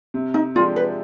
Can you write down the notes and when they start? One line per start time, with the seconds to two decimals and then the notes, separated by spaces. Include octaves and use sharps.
0.14 C3
0.34 D#4
0.55 F3 G#3 D4 F4 G4
0.76 B4